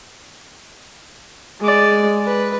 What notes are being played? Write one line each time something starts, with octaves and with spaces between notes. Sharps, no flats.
G#3 D5
B4